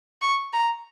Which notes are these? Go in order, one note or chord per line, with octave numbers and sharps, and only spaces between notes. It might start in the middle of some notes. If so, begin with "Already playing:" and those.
C#6
A#5